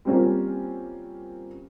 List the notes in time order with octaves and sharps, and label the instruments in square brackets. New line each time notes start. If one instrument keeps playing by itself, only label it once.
[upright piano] G3 A#3 C4 C#4 F4 A#4